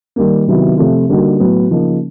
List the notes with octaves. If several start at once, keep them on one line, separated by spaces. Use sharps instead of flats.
D#3 G3 A#3
C3 D#3 F#3 B3 E4
C3 F3 A3 C4 F4
D3 G3 A#3 D#4 F#4
A2 F#3 B3
C#3 F3 A#3 D#4